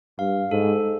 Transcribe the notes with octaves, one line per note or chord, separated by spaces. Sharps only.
G2 F5
G#2 A4